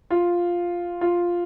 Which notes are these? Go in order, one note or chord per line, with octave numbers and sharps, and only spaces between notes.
F4
F4